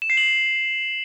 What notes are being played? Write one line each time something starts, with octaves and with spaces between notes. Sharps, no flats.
E7
C7
F#7